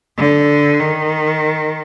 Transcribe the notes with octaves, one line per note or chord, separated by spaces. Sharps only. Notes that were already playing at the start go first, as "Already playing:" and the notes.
D3
D#3